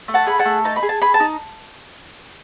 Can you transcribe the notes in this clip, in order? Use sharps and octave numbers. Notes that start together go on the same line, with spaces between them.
A3
F#5 A5
G#4 B5
F#5 A5
A3
D#4 A5
B5
G#4
A5
G#4 B5
A5
D#4